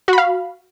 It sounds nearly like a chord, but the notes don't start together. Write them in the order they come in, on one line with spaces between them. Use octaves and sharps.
F#4 B5 F5